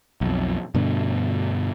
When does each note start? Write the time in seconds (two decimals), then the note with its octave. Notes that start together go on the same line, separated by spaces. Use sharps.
0.21 B1 F2
0.75 G2 B2 D3